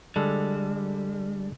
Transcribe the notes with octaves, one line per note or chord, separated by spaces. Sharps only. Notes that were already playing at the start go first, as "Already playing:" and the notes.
D3 G3 G#3 A4